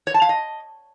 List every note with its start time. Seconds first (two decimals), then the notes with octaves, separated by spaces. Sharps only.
0.07 C#5
0.14 A5
0.22 F5
0.29 D#5